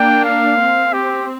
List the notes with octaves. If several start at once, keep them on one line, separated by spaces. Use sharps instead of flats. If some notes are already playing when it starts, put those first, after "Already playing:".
Already playing: A#3 D4 G5
F5
C4
G4